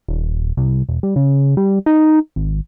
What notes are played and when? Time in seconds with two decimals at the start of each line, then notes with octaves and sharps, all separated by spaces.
0.08 D#1
0.57 C2
0.88 E1
1.03 G3
1.16 C#3
1.57 G3
1.86 D#4
2.36 G#1